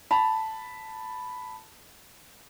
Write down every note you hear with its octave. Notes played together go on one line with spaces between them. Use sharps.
A5 B5